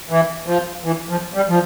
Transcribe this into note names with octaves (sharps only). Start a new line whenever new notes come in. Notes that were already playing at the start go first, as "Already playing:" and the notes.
E3
F3
E3
F3
G3
F3